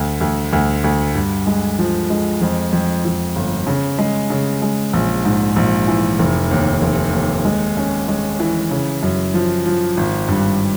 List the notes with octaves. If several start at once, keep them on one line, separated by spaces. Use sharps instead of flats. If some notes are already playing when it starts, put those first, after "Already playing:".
Already playing: D2
D2
D2
D2
G2
G#3
F3
G#3
F2
F2
F2
G1
C#3
G#3
C#3
G#3
A#1
G#2
A#1
E3
F1
D#2
F1
D#2
G#3
C#4
G#3
E3
C#3
F#2
F3
F3
G#1
G2